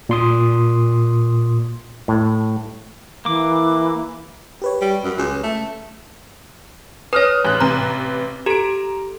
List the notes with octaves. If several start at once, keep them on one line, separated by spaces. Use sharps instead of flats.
A#2 C6 D#6
A2
E3 A#3 D6
G4 B4 C#5
G3
F#2
C#2
A3
B4 C#5 D#6 F6 A#6
A1 F#6
A1 C3 B4 A#5
G4 A4 A#5 D7